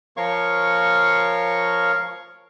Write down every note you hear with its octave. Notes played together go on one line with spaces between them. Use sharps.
F3 A#4 C#5 F5 C#6